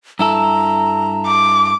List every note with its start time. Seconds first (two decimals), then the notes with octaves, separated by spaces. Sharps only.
0.19 G2 E4 A4 A#5
1.26 D6